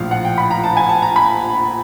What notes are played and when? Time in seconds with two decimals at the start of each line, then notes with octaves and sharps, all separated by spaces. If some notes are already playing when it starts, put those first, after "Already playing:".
Already playing: A#1 A2 F3 F5
0.11 F#5
0.25 G5
0.38 B5
0.51 A#5
0.64 A5
0.77 G#5
0.89 A5
1.02 A#5
1.16 B5